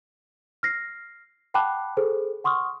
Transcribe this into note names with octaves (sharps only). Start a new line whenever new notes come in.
F6 A#6 C7
F#5 G5 A5 B5 D6 F#6
G#4 A4 C5
F#5 C6 C#6 D#6 F6